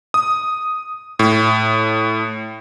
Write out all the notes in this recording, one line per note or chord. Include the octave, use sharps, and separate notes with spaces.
D#6
A2